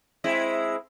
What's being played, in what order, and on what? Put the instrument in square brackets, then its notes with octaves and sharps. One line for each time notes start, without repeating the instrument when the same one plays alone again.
[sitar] G#3 C4 E4